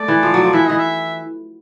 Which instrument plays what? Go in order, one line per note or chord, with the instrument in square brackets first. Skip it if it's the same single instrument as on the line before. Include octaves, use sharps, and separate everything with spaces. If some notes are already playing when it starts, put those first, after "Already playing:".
Already playing: [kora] A3 [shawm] D5
[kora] E3
F3
F#3
F3
[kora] E3 [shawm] E5
[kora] E3 [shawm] D#5
[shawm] E5